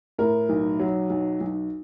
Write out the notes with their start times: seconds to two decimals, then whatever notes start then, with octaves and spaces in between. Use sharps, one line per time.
0.18 A2 A#4
0.49 B1
0.79 F#3
1.10 B1
1.40 B1